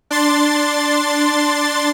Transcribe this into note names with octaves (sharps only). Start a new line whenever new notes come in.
D4 C6 A6